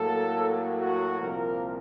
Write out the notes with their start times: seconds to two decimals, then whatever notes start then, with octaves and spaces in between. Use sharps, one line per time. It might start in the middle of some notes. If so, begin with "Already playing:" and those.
Already playing: A2 F#3 A#3 A4
0.81 F#4
1.20 C2 A#2 F3 A#3 A#4